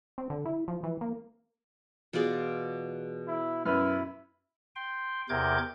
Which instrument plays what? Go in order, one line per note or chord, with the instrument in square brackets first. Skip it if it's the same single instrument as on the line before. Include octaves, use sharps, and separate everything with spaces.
[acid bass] C4
D3
E4
F3
E3
A#3
[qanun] B2 F4 D5 [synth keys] E3 G#4
[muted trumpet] E4
[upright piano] F#2 B4 [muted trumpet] E4 [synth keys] F6
[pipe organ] G5 C6
E2 C3 A#4 D6 G6 G#6